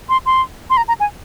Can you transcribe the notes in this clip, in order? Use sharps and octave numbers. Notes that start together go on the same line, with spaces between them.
C6
C6
C6
A#5
A#5
G#5